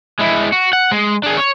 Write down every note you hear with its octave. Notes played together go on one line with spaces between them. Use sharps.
G#3 E4
F#4
F#5
G#3
D4 G#4
C#5